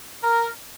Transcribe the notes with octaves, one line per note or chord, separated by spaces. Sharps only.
A#4